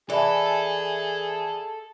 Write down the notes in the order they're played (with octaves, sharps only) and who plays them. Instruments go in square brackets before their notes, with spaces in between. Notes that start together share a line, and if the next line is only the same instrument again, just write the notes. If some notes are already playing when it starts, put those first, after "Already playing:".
[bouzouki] E3 [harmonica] G#4 [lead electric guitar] A4 A5 [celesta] D5 E5 B5